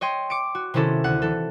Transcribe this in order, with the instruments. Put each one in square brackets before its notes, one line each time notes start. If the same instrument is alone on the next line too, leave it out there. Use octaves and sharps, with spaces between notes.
[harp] C#5 D#5 G5 C6
D6 C#7 D7
F#4
C3 D#3 C4 C#4 E4 A4
D2 F#5
E3 A4